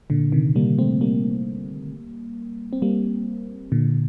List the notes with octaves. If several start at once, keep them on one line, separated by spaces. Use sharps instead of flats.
A#2 D3
C3 D#3
G3 A#3
A3 C4
G3 A#3
C4
G3 A#3
A#2 D3